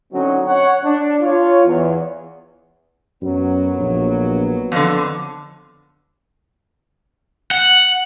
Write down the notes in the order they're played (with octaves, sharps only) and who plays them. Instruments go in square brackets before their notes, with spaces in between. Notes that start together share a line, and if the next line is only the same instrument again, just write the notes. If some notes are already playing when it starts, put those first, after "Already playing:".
[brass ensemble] D3 F#3 C4 C#4 D#4 F#4
C#5 F#5
D4
F4 C#5
E2
[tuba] F#2 [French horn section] F#3 B3
[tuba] A#1
[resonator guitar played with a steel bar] F2 D3
[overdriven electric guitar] F#5